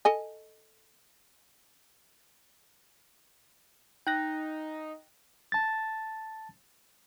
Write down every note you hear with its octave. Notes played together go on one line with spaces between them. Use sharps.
A4 D#5 G#5
D#4 G5 F#6 A#6
A5 A6